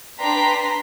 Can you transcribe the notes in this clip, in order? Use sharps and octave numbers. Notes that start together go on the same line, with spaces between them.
D4 B4 G5 A#5 C6 B6